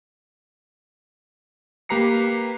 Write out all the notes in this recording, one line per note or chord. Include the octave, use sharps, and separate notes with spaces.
A#3 G4 B4 A#5 C7 C#7